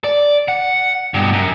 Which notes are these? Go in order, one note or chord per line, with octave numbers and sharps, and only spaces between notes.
D5
F#5
G2 B2
F#2